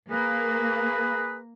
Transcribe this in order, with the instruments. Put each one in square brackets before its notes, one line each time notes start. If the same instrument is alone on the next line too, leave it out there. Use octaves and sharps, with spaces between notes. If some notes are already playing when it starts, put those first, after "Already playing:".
[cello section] A#3 [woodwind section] G#4 B4